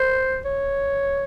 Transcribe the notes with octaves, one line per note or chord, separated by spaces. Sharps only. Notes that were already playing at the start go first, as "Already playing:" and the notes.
Already playing: C5
C#5